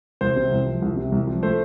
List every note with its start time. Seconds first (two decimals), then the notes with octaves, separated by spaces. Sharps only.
0.21 C2 C5
0.36 C3
0.51 C2
0.67 F3
0.82 C2
0.97 C3
1.12 C2
1.27 F3
1.42 A3 C5